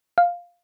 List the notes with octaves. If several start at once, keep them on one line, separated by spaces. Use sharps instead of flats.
F5